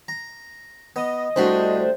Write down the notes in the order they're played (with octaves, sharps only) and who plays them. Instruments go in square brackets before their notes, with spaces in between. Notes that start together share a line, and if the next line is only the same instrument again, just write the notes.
[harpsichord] A#5
[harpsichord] B3 [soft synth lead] D#5
[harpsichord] C2 F#4 [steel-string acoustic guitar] A3 D4 G4 [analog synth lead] C5